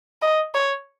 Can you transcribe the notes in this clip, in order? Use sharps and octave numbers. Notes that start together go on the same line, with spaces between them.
D#5
C#5